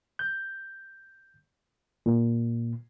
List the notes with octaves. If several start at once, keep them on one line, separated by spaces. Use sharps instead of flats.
G6
A#2